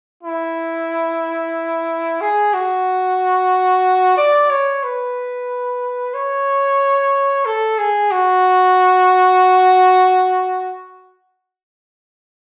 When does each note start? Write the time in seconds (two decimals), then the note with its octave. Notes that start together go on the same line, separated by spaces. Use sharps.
0.23 E4
2.21 G#4
2.54 F#4
4.18 D5
4.50 C#5
4.84 B4
6.14 C#5
7.46 A4
7.78 G#4
8.11 F#4